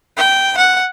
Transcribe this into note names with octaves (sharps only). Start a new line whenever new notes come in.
G5
F#5